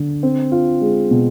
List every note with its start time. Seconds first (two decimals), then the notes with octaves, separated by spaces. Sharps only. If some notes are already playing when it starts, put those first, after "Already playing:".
Already playing: D3
0.23 C4
0.52 F4
0.81 G#3
1.11 B2